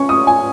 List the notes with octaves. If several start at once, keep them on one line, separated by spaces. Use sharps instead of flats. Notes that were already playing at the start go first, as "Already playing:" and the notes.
Already playing: C#4 C#6
D#6
G#5